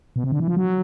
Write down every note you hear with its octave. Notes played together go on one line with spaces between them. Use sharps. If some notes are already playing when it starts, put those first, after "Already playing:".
B2
C3
D3
E3
F3
F#3